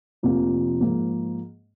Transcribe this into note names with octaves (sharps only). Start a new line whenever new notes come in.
F1 F2 C3 F3 A#3
G#2 F3 A#3